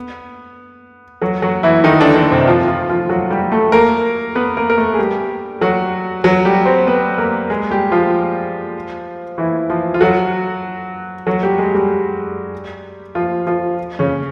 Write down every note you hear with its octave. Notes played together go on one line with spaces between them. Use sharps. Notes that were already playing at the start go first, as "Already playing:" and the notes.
Already playing: B3
F#3 F#4
F#3 F#4
E3 E4
D#3 D#4
D3 D4
D3 D4
C3 C4
F3 F4
F3 F4
F3 F4
F#3 F#4
G3 G4
A3 A4
A#3 A#4
B3 B4
A#3 A#4
A#4
A3 A4
G#4
G3 G4
F#3 F#4
F#3 F#4
G3 G4
C4 C5
B3 B4
A#3 A#4
G#3 G#4
G3 G4
F3 F4
E3 E4
F3 F4
F4
F#3 F#4
F#3 F#4
G3 G4
G#3 G#4
G3 G4
F3 F4
F3 F4
C#3 C#4